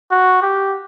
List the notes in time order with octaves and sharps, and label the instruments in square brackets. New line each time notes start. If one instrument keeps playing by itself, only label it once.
[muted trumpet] F#4
G4